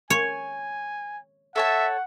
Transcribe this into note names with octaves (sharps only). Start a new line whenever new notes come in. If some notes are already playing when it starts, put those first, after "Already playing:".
C#5 G#5
A4 C#5 E5 F#5 A5